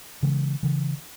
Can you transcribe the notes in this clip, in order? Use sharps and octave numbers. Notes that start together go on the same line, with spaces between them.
C#3 E3 G#3
C#3 E3